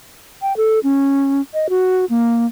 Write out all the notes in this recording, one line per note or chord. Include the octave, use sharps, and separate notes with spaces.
G5
A4
C#4
D#5
F#4
A#3